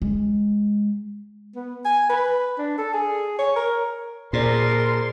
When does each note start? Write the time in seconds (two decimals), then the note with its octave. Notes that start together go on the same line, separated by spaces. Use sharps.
0.02 G#3
1.55 B3
1.85 G#5
2.10 B4
2.58 D4
2.78 A4
2.94 G#4
3.39 C#5
3.56 A#4
4.33 A#2 G#4 A#4 C5 D5 C6